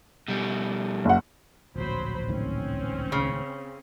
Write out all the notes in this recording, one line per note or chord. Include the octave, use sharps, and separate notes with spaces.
B2 G3
F#1 F#5
D1 A#1 F#3 C5 B5
C#2 A2 D#3 C4 C#4
C#3